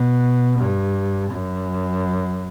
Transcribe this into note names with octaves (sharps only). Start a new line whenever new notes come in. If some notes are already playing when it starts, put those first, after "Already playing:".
Already playing: B2
G2
F#2